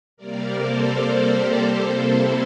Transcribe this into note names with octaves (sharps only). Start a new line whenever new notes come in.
C3 G3 A#3 A#4 D5
A4 C5
A4 C5
G4 A#4
C3 G3 A#3 A4 C5
C4 E4